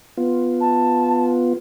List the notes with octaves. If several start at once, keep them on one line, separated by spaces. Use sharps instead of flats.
B3 F4
A5